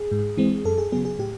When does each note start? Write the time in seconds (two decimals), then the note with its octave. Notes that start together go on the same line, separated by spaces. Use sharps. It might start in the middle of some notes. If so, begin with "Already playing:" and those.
Already playing: G#4
0.11 G#2
0.37 E3 G#3 C4
0.65 F#2 A4
0.78 G#4
0.92 C#3 F#3 B3 G#4
1.05 G#4
1.19 A2 G4